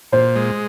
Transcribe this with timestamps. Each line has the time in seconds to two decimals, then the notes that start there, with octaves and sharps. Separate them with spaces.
0.12 A#2 C5
0.36 G#3